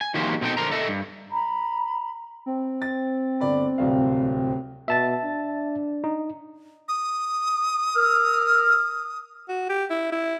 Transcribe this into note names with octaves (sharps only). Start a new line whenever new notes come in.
G#5
D#3 E3 F#3 A#3 G4 C5
B2 C4 D#4 A4 G5
D3 A#4 C5 A#5
A4 D#5 E5
G2
A#5 B5
C4
A6
G1 D5 B5
D1 C2 F5
B2 E5 A5 A6
D4
D#4
D#6
A#4 E6 F6
F#4
G4
E4
E4